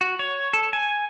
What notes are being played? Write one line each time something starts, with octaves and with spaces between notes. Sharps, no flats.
F#4
C#5
A4
G#5